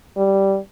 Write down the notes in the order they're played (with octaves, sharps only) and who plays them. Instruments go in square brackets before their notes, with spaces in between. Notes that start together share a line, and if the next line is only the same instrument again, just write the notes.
[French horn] G3